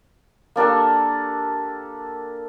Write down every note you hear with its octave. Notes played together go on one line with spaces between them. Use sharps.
A#3 D4 G4 A4